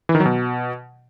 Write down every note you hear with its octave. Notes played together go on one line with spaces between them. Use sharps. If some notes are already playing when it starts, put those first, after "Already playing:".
E3
D#3
F#3
B2